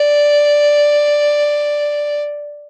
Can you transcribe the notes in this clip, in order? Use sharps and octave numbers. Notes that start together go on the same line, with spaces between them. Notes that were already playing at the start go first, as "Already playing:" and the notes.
Already playing: D5